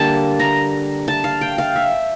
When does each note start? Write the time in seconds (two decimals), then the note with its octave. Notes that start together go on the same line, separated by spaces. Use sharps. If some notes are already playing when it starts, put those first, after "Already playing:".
Already playing: D3 G3 A#3 A5
0.39 A#5
1.08 A5
1.24 F5
1.41 G5
1.58 F5
1.76 E5